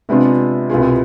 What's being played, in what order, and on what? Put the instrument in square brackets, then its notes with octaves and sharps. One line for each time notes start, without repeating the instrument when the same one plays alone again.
[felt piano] C3 G#3 B3 D4 F4
C2 B2 B3 F4 G#4